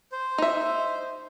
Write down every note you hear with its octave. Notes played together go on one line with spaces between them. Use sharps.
C5
D#4 E5